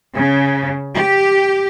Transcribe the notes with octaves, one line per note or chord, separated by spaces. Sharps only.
C#3
G4